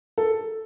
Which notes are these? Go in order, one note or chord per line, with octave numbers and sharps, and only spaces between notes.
A4